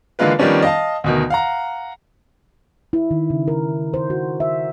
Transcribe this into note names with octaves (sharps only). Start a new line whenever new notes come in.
D3 E3 G#3 A#3 F4 B4
D#3 F3 G3 B3 C#4 D4
D#5 F5 A5
D2 B2 D#3
F5 F#5 A#5
E4
D#3
C#3
A#4
C5
F#4
E5